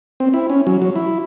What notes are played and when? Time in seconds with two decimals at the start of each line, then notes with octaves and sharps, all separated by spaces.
0.20 C4
0.34 E4
0.50 C#4
0.67 F#3
0.82 F#3
0.96 E4